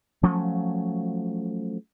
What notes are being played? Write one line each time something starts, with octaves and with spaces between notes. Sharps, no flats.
F3 F#3 A3 C#4